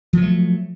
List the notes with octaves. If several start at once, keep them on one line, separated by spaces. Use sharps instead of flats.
F3 F#3 A3